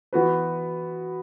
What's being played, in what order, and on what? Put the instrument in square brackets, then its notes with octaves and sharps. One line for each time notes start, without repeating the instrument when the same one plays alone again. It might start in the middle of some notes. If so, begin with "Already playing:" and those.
[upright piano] E3 B3 F#4 B4